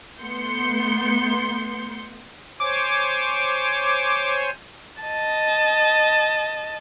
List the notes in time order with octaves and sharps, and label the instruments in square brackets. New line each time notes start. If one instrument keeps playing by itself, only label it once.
[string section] A3 B3 C6 G6 C#7
[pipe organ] C5 C#5 G#5 [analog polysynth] D6
[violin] D#5 A5